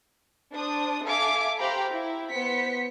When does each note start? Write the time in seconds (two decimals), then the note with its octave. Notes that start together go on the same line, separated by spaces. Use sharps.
0.54 D4 C5 D#6
1.05 A4 E5 F5 G#5 D6
1.58 G4 C5 F5 G5 A#5 B5
1.91 E4
2.31 B3 C5 B6 C#7